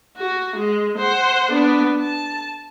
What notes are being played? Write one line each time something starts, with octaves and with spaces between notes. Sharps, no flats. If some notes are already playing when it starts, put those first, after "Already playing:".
F#4
G#3
C5 F#5
B3 D4
A5